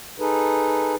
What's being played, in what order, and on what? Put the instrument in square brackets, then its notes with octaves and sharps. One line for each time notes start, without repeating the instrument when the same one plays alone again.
[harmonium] D#4 G#4 A4 B4